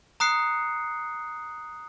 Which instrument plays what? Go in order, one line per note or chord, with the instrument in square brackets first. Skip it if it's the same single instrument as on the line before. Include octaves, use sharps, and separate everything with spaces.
[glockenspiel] A#5 D#6 F#6 C7 C#7